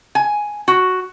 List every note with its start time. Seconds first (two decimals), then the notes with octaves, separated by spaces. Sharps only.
0.15 G#5
0.68 F#4